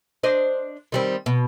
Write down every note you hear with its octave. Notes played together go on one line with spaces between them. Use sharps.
D4 C5 D#5
D#3 G3 C4
B2